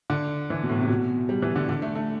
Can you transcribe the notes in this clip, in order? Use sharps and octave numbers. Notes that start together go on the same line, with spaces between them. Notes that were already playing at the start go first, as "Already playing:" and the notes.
D3
E3
B2
A2
C3
B2
G3
E3
D3
D3
A3
A3